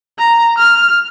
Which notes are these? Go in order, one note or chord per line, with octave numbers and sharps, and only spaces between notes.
A#5
F6